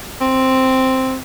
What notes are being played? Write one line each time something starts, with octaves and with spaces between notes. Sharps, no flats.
C4